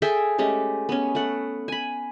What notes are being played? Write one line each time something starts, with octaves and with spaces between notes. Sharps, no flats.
G#4 A4 E5 G5
G#3 A3 C#4 G4
B3 C#4
A3 F#5
G#5 B5